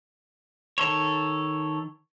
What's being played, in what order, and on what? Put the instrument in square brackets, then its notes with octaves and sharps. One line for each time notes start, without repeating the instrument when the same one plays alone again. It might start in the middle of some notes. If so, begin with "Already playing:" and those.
[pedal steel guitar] D#3 A4 C#5